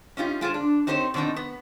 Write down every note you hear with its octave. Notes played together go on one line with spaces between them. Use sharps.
C#4 D#4 F4 G4
G#3 F4 G#4 C5
D4
C4 D#4 G4 C5 C#5
B2 D#3 C4 D4 D#4
B3